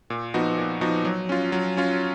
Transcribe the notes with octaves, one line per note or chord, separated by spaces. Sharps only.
A#2
F3 B3 D#4 F#4
A#2
F3 B3 D#4 F#4
F#3
C#4 F4
F#3
C#4 F4